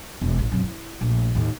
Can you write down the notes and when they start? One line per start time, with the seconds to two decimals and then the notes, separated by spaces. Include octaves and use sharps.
0.21 E1
0.39 A1
0.52 F#2 C3
0.63 E4
1.01 A#1 A3
1.35 D#2 A2